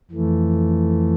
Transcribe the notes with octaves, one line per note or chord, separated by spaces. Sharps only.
F2 E3 A3